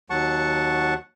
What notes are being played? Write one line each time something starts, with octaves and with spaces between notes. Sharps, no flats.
D#2 F#3 F#5 A5 C#6